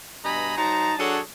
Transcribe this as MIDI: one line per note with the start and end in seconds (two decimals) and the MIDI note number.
0.25 0.55 43
0.25 0.55 47
0.25 0.55 75
0.25 0.55 80
0.25 0.55 82
0.25 0.55 83
0.58 0.94 54
0.58 0.94 63
0.58 0.94 72
0.58 0.94 81
0.58 0.94 82
0.99 1.20 54
0.99 1.20 62
0.99 1.20 68
0.99 1.20 69
0.99 1.20 73
0.99 1.20 78